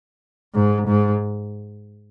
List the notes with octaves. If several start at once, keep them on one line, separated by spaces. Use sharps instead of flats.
G#2
G#2